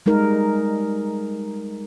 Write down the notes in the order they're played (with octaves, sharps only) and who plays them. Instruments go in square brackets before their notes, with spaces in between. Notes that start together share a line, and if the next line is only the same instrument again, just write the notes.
[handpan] G3 G#3 D#4 A#4